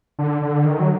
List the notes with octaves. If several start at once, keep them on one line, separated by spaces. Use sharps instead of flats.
D3
D3
D#3
F#3